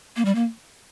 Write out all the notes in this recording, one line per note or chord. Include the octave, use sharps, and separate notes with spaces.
A#3
G3
A#3